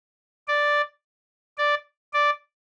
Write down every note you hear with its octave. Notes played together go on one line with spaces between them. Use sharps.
D5
D5
D5